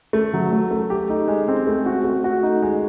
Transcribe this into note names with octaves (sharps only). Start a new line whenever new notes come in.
A3
F#3
A3
A3
G4
D#4
G#3
C4
A3
F#4
A3
F#4
D#4
G#3